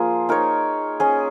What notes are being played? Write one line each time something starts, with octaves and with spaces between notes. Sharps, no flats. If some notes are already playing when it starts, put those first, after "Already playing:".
Already playing: F3 A#3 F4 G#4
D#4 A#4 C#5
C#4 G#4 D#5